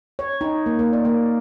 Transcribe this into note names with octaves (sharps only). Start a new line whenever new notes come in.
C#5
D#4
A#3
A#3
D5
A#3